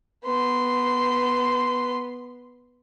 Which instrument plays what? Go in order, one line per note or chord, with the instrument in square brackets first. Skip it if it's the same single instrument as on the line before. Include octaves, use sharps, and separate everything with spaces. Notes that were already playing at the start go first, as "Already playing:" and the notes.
[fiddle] B3 C6